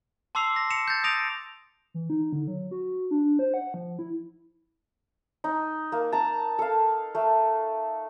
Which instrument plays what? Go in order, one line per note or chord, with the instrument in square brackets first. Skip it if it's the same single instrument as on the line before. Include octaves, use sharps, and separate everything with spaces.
[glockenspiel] A5 C6 D6 E6 C7 F7
A#6
C#7 E7 F7
G6 A6
D#6 G6 A#6 D7 D#7 F7
[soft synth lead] E3
D#4
D3
F#3
F#4
D4
C5
F#5
F3
E4
[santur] D#4
A#3
A5 A#5
A4 F5
A3